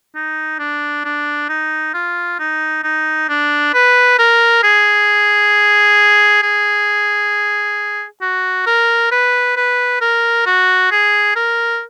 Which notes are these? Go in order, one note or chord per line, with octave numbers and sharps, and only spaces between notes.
D#4
D4
D4
D#4
F4
D#4
D#4
D4
B4
A#4
G#4
G#4
F#4
A#4
B4
B4
A#4
F#4
G#4
A#4